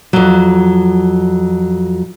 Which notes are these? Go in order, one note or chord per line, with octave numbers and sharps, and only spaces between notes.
F2 F#3